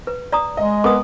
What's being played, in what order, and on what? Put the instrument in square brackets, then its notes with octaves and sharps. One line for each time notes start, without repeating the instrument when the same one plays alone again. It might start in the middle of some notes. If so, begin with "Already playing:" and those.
[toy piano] B4
D5 A#5 D#6
[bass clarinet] G#3 [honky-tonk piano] D#5
[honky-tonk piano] B3 A#4 B4 [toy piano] D6 D#6